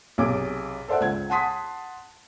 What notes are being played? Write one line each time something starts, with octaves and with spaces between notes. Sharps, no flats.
B1 C3 G#4 D6
A4 C5 D5 E5 F#5
C#2 G#6
F#5 A5 C6 D#6 B6